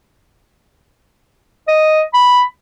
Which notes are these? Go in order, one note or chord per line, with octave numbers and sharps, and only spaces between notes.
D#5
B5